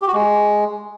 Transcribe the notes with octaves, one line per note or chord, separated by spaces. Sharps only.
G4
F#4
G#3